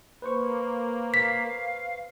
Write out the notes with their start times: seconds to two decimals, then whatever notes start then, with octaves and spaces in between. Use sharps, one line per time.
0.22 A#3 B4 C5 C#6
1.14 F5 B6